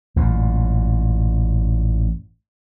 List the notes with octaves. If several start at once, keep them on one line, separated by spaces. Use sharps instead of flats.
A1 F#2 A#2